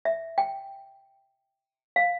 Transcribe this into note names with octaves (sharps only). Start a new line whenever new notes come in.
E5
G5
F5